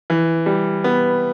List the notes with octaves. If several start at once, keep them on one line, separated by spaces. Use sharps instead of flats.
E3
G3
B3